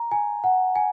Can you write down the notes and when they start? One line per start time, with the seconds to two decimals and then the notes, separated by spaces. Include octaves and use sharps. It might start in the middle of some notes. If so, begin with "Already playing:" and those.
Already playing: A#5
0.11 G#5
0.44 F#5
0.76 G#5